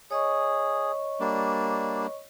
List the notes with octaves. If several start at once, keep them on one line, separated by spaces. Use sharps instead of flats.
G#4 C#5 D#5 C#6
G3 A#3 D4